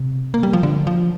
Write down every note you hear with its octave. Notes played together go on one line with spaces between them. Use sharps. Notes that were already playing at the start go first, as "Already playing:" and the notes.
Already playing: C3
A#3
G3
F3
D3
F3